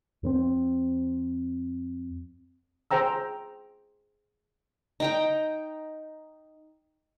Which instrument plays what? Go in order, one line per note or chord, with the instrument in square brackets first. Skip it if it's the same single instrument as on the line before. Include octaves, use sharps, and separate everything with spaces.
[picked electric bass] F2 B3 C4
[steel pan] G#4 C5 G5 A#5 E6
[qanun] D#4 G5 A#5